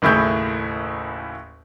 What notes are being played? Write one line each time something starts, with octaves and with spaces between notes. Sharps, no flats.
F#1 D#2 A2 E4 G#4 G6